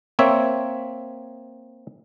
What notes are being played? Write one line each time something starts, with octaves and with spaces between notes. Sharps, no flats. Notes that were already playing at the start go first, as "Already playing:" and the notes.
A#3 C4 C#5 E5